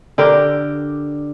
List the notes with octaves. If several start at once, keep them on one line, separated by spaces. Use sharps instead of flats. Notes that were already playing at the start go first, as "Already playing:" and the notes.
D3 G4 A#4 D5